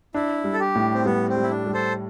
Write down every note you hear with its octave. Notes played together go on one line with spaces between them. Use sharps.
D4 E4
G3
A4
G4
A2
C4
G3 B3
C4
G3
E4
D4
G3
A4 C5